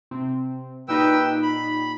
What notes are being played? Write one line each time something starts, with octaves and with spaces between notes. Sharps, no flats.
C3 C4
A#2 D#4 G4 B4 G5 E6
B5